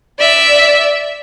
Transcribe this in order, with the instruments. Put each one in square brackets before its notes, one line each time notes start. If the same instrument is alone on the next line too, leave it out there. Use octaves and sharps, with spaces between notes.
[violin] D5 E5